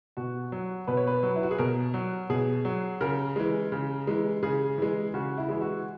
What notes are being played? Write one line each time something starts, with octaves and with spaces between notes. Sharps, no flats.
B2 F#4
F#3
B2 B4
C#5
B4
F#3
E4
F#4
G#4
B2 A#4
F#3
B2 G#4
F#3
C#3 A#4
E3 G#3
C#3
E3 G#3
C#3 G#4
E3 G#3
C#3 F#4
E4
E3 G#3
F#4